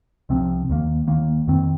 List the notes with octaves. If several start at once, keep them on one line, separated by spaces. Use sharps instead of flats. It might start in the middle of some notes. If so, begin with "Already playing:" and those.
C2 C3 F3 C4
D#2 D#3 A#3
D#2 D#3 A#3
F2 D#3 C4